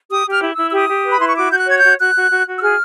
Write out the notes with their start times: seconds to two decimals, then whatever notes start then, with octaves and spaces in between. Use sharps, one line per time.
0.09 G4 D#6
0.26 G4
0.31 F6
0.42 E4
0.52 E4 E6
0.69 E6
0.72 G4 D#6
0.89 G4
1.04 B4
1.11 B5
1.19 E4 C6
1.27 C#6
1.36 F#4 D6
1.52 F#4 G6
1.57 F#6
1.67 C#5 G#6
1.78 G6
1.83 F#4
1.99 F#4 F#6
2.15 F#4
2.30 F#4
2.46 F#4
2.57 E6
2.62 G#4 F6